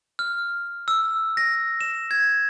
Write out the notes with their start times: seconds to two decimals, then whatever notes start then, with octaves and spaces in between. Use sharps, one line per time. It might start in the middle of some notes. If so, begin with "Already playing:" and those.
0.19 F6
0.88 E6
1.37 A#6
1.81 E7
2.11 G#6